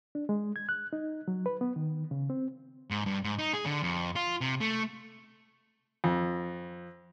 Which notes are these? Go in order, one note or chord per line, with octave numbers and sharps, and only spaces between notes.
D4
G#3
G#6
F#6
D#4
F#3
B4
B3
D#3
C#3
C4
G#2
G2
G#2
D#4
G#4
D3
F2
F4
C3
A3
F2